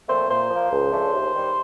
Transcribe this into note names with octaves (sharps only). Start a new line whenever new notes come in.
A#2 F3 A3 C4 C5
A#2 C5
F3 A#3
C#2
C#3 F3 A3 D4
D#2
D#3 G3